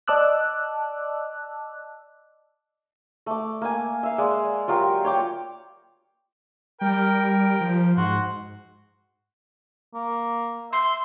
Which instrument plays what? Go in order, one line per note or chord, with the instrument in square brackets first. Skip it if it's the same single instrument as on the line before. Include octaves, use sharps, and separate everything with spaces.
[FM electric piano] D5 D#5 A5 D6 E6 F#6
[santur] A3 D6
A#3 G#5
E5 F5
G#3 D5
F#3 F4 G4 A#4
C#5 G5 D6
[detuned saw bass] G3 [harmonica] A#4 G5
[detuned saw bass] F3
[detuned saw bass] G#2 [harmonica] F#4 C6
[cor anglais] A#3
[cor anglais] E5 [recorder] C6